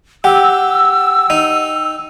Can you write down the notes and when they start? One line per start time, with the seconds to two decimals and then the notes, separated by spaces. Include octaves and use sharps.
0.24 G4 F#5 G5 E6
1.30 D#4